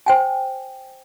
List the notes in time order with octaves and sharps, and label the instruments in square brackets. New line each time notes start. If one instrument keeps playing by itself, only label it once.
[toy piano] C5 G5 G#5